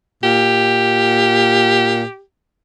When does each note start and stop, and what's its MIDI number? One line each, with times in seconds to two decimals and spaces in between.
0.23 2.03 46
0.23 2.22 67